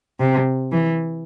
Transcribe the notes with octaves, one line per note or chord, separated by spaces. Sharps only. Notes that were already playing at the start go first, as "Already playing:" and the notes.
C3
E3